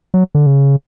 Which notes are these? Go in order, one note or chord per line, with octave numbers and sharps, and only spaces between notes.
F#3
D3
C#3